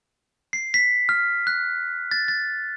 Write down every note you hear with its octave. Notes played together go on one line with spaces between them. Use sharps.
C7
B6
F6
F#6
A6
A6